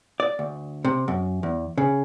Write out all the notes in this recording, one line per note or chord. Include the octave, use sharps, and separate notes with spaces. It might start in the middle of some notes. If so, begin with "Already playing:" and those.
D5
D2
C3
F#2
E2
C#3